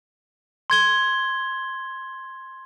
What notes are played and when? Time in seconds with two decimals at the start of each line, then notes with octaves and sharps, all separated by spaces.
0.70 C6 G#6 G7